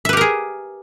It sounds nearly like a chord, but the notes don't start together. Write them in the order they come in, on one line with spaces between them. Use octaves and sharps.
E5 B4 G4 A#4 G#4